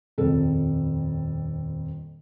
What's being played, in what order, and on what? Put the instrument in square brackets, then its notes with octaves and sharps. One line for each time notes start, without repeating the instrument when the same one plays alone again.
[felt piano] D#1 F2 A4